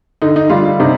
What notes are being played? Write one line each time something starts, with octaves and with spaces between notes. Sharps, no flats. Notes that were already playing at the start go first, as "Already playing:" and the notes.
D3 D#4
D#4
G3 F4
C3 D#4